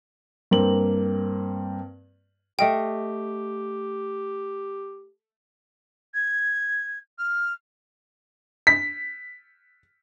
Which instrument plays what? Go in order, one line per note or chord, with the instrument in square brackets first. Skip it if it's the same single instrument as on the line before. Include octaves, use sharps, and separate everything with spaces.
[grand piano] G2 A#3 C4 F#7
[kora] A3 D#5 F5 [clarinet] G4 [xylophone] G5
[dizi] G#6
F6
[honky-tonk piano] B6